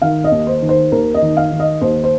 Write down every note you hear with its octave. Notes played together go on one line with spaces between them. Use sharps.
D#3 F5
D#5
D#2
C5
D#3
C5
D#2 A#4
D#5
D#3
F5
D#3
D#5
D#2 C5
C5